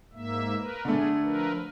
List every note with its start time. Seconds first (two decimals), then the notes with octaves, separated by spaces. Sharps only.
0.13 G#2 A#3 E5
0.56 A#4 B4
0.85 D3 A3 G#4
1.22 F3 A#4 B4